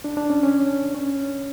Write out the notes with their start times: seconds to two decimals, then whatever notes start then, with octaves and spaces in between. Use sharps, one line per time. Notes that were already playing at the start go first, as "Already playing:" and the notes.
0.04 D4
0.17 D4
0.30 C#4
0.43 C#4
0.95 C#4